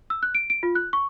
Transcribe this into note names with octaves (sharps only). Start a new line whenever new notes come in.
E6
F#6
D7
D7
F4
F#6
C#6